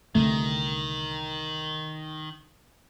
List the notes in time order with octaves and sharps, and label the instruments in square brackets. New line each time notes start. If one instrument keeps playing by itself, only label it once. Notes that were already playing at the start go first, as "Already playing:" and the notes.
[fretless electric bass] C2 D3 A3 [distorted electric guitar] D#3